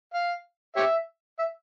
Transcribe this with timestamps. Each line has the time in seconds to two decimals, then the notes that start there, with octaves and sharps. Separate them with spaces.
0.14 F5
0.76 G4 C#5 E5
1.39 E5